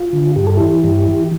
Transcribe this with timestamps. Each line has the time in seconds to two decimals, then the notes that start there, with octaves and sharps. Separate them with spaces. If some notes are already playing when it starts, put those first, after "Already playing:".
Already playing: F4
0.13 D3
0.36 G2 G4
0.47 A4
0.57 E3 E4 G4
0.84 G2
1.08 E3